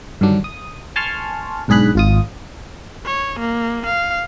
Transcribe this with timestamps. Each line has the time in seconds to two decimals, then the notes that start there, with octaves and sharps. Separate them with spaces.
0.21 G2 D3 D#3 F#3 D4
0.44 D#6
0.96 G#5 A5 C6 C#6 F6
1.68 B1 G#2 D4 G#4 B5 F#6
1.95 G#1 F4 D#6
3.05 C#5
3.39 A#3
3.86 F5